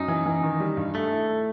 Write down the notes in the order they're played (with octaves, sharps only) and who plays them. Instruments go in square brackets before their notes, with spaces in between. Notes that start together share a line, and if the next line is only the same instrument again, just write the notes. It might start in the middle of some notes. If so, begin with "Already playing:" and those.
Already playing: [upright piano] F#2 [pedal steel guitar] D#4
[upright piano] E3
E3
D#3
G3
G2
[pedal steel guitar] A3 [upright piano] A4
[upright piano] E4
A4